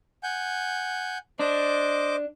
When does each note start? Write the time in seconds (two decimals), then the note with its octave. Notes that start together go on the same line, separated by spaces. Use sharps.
0.23 F#5 G#5 G6
1.39 D4 C5 D#5 D6